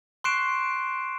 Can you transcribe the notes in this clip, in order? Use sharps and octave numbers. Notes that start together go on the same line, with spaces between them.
C6 C#6 F#6 C7 D7 E7